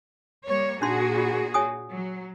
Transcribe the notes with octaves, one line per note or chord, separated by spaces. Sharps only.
G3 A#3 C#5
A#2 D4 D#4 F#4 G#4 C6
F4
C#5 G#5 D#6
F#3